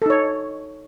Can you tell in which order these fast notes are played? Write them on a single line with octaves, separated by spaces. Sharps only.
A4 D#4 C#5